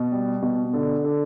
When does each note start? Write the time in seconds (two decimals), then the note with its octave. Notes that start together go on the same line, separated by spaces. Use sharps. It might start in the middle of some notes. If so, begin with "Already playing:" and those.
Already playing: B2
0.12 G3
0.42 B2
0.73 D3
1.04 D3